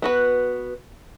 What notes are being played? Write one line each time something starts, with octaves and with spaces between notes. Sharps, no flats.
B3 F#4 B4